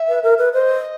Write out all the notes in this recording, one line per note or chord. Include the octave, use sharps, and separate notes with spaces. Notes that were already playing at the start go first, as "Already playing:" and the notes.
Already playing: E5
B4
A#4
B4
C5 D#5